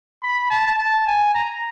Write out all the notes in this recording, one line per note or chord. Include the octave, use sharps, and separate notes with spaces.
B5
A5
A5
G#5
A#5